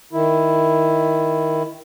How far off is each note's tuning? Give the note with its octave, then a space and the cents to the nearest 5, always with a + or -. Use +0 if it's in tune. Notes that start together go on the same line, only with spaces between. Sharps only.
D#3 +10 E4 +0